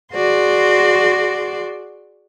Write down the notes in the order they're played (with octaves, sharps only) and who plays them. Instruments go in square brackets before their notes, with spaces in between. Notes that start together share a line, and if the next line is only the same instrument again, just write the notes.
[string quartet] F#4 G#4 D5 C6